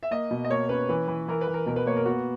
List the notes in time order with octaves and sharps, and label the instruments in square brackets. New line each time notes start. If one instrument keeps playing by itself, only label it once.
[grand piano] E5
A#3 D#5
B2
D#5
A#3 C#5
C#4 B4
E3 B4
E3
E3 A#4
B4
E3
A#4
B2 A#4
B4
A#3 C#5
A#4
B3 F#4